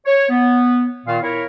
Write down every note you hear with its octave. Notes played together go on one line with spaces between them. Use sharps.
C#5
B3
A#2 D#3 F4 F5
E4 A#4 C#5